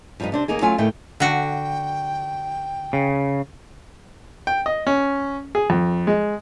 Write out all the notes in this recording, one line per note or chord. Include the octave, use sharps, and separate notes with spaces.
G2 F3 G3 B3 D#4
C3 D4 C5
D#2 A#3 D#4 G#4
F#3 A3 C#4 F4 F5 G#5
D#2 A2 D#3 A3 G5
D3 F#4 G5
C#3
G5
D#5
C#4
G#4
F2
G#3